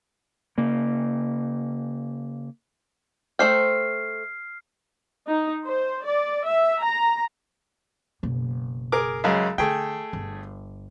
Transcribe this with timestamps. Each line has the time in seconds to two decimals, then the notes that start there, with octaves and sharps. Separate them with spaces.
0.58 C#3 A#3
3.39 A3 C5 G5 F6 C7
5.28 D#4
5.65 C5
6.04 D5
6.45 E5
6.80 A#5
8.23 F#1 B2
8.92 G#4 A#4 D6
9.24 F#2 C#3 G#3
9.58 D3 A3 G#4 G5
10.13 G1